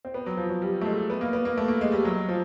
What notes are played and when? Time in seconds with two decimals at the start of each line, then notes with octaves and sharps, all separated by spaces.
0.05 C4
0.14 B3
0.26 F#3
0.37 F3
0.50 F#3
0.62 G3
0.81 A3
0.85 G#3
1.10 B3
1.21 A#3
1.33 B3
1.45 A#3
1.57 A3
1.68 A#3
1.81 G#3
1.92 G3
2.05 F#3
2.29 F3